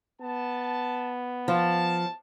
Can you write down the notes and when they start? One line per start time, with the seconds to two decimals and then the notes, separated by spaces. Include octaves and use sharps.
0.21 B3 A5
1.48 F3 A5